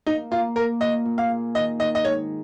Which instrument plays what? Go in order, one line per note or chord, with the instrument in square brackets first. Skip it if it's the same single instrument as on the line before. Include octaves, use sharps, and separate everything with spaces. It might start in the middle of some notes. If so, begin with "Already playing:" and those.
[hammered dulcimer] A#3 [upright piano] D#4
[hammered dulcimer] A#3 [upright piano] F4
[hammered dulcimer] A#3 [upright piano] A#4
[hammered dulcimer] A#2 [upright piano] D#5
[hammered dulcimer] A#2
[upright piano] F5
[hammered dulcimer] G#4
[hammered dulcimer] D#3 [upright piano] D#5
[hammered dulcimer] D#3 [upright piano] D#5
[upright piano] D#5
[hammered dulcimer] G#2 [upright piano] C#5